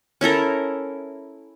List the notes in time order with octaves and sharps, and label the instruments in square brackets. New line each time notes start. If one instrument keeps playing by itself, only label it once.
[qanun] C#4 E4 A4 A#4